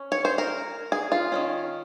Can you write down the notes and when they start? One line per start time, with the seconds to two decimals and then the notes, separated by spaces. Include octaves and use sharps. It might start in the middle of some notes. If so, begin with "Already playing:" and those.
Already playing: C#4
0.12 C#5
0.25 C5
0.38 A#4
0.92 G#4
1.12 F4
1.32 D#3 G#3 C#4